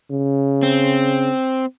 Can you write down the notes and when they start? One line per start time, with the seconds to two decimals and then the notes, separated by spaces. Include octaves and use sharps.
0.11 C#3
0.63 C4